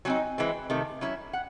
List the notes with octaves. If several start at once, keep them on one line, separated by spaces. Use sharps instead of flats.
F#3 C4 D#4 G#5
E3 G#3 C4
C3 D#3 A3
F#3 C#4 E4
F#5